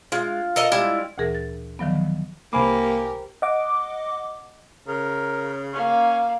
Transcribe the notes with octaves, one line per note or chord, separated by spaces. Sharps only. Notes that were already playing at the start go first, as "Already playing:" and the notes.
G#3 F4
A4 A#4 D#5
G3 G#3 E4
D2 A#2 E3 G#4 A#4 A#6
A6
D3 D#3 F3 F#3 B3
C2 A#3 G4 A#4 C5 G#5 B5 D6
D#5 F#5 D6
C#3 A#4
A#3 C#4 F5